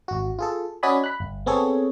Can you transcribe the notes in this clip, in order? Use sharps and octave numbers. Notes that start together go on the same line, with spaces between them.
G#1 F#4
F4 G#4 A4
C#4 F#4 D5 D#5 G#5 B5
B5 F#6
G1
B3 C4 G#4 A4 C#5